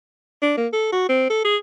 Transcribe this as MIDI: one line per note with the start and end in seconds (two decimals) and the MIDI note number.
0.42 0.55 62
0.57 0.68 58
0.73 0.90 69
0.92 1.06 66
1.09 1.27 60
1.30 1.41 69
1.44 1.56 68